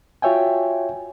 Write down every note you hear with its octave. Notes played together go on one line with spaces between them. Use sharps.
F4 F#4 C#5 E5 G5 G#5